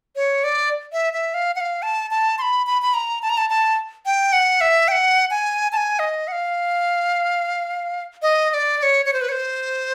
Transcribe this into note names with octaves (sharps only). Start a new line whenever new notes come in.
C#5
D5
E5
E5
F5
F#5
F5
A5
A5
C6
B5
B5
B5
A#5
A5
A#5
A5
A5
G5
F#5
E5
G5
F#5
G#5
A5
G#5
D#5
F#5
F5
D#5
D#5
D5
D5
C#5
C#5
C5
B4
C#5
C5